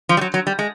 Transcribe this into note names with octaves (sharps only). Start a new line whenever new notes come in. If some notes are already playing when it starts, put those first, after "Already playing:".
F3
G3
F#3
F#3
G3
G#3